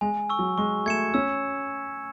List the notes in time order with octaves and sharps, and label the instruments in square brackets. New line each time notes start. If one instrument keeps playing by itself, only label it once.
[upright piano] G#3 [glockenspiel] G#5
[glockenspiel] C#6 E6
[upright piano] F#3
[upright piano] G#3 [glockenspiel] C#6
[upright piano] A3 [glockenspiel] G#6 C#7 E7
[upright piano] C#4 [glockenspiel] E6